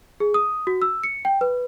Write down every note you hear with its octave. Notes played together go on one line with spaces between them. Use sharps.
G#4
D#6
F#4
E6
C#7
G5
B4